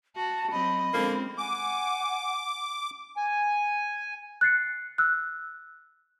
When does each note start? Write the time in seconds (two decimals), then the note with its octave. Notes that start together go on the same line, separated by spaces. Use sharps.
0.16 F#4 A5
0.52 F#3 C4 D#5 B5
0.94 D3 F3 G#3 A#3 C4 C#4
1.38 F#5 G#5 D6
3.17 G#5
4.41 F#6 A6 C7 C#7
4.98 E6 F#6